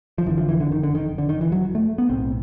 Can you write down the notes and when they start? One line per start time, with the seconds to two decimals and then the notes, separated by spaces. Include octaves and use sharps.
0.18 F3
0.26 F#1 F2 D3 E3
0.38 F3
0.49 E3
0.60 D3
0.72 D#3
0.83 D3
0.95 D#3
1.18 D3
1.29 D#3
1.41 E3
1.52 F#3
1.75 A3
1.98 B3
2.09 B1 A2 C4